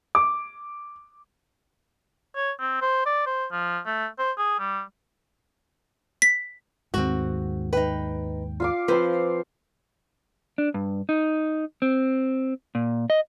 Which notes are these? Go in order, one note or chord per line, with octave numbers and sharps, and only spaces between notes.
D6
C#5
C4
C5
D5
C5
F3
A3
C5
G#4
G3
B6
D#2 G#2 C4 F#4
D#4 B4 G5
F4 F5 D6
F3 C4 F4 B4 C5 C6
D4
G2
D#4
C4
A#2
D#5